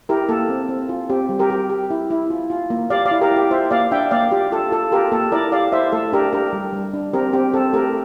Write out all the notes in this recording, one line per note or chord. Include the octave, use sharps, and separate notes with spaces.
E4 G4 A#4
A#3 A4
C4
C4
F4
C4 G4
G3
G4 A#4
G4
G4
E4
E4
F4
F4
A#3
G4 D5 F5
D5 F5
E4
G4 A#4
E4 G4
F4 C5 E5
A#3 D5 F5
D4 E5 G5
A#3 D5 F5
F4 G4
F4 A4
F4 A4
F4 G4 A#4
A#3 A4
E4 A#4 D5
G4 D5 F5
E4 C5 E5
A3 A4
D4 G4 A#4
D4 G4 A#4
G3
G3
D4
C4 G4 A#4
C4 G4
C4 A4
A3 G4 A#4